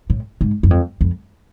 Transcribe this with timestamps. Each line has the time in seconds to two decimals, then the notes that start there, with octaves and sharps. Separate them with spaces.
0.10 A2
0.41 G#2
0.63 F#2
0.71 F2
1.01 F2